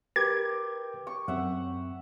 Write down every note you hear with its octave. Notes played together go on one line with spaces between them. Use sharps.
G4 A#4 B4 G#6
C#6
F#2 C4 E5 F#5